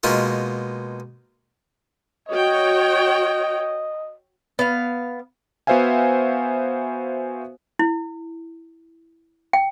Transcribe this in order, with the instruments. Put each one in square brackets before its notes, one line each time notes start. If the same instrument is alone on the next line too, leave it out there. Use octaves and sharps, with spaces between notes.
[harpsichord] B2 G#3 A#3 D#4 F4
[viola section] F#4 C#5 G5 [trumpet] D#5
[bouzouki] B3 F5
[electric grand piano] B3 F#4 C5 E5 F5 G#5
[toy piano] E4
G5